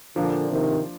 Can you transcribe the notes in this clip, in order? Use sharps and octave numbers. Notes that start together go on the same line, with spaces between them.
A#2 D3 F3 A#3 D4
C3 D#3